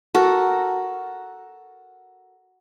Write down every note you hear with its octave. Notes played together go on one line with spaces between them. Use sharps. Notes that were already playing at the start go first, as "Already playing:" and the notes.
F#4 A4 A#4